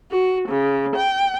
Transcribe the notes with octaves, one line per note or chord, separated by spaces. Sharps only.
F#4
C#3
G5